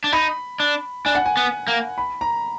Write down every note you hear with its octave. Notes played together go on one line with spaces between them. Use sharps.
D4
D#4 B5
D4
D4 G#5
F#5
G#5
B3
A#3
B5
A#5